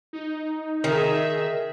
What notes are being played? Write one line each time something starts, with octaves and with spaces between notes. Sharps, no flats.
D#4
D#3 G#4 E5